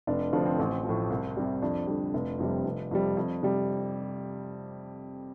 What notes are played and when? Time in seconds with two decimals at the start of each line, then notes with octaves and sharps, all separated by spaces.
0.07 F1 D4
0.33 F2 D3 F3 D4
0.46 C4
0.59 A1
0.84 F3
0.89 A2
1.10 C2
1.37 C3 G3
1.62 F2 D4
1.87 D3 G3
2.14 F1
2.39 F2 C3 G3
2.65 F1
2.91 F2 C3 G3
3.17 F2
3.43 C3 G3